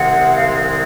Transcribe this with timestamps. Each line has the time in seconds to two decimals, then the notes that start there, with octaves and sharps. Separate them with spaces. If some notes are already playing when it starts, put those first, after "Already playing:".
Already playing: C2 C3 D#3 G#3 C4 F#5
0.34 F5